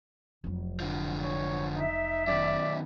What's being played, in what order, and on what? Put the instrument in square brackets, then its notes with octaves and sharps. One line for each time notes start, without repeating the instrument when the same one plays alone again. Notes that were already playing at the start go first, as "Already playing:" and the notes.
[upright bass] F1 F#3
[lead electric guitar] D3 F3
[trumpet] C#5
[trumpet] D#4 [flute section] E5
[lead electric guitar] F#2 D#3 [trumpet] D5